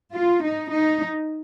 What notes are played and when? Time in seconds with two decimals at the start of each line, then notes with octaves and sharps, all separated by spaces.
0.14 F4
0.42 D#4
0.72 D#4